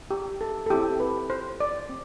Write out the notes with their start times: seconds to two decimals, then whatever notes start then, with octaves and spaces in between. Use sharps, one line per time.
0.11 G4
0.41 A4
0.66 A4
0.70 C4 E4 G4
1.00 B4
1.30 C5
1.60 D5
1.89 C4